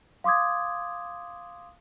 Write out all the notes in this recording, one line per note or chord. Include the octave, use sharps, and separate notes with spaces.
F5 C6 D6 D#6 G#6